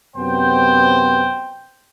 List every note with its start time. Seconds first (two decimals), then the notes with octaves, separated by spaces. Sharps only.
0.17 F#2 C3 B3 C5 G5